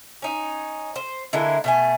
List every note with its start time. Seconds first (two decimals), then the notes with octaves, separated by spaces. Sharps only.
0.22 C#4 D#4
0.96 C5
1.33 D3 G#3 A#3 E4
1.64 B2 A3 G#5